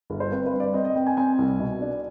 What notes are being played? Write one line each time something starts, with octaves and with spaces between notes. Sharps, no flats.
G1
C5
C4 B4
B4
G2
D5
C4 D#5
D#5
C4 G5
G#5
C4 G#5
C2
B2
D4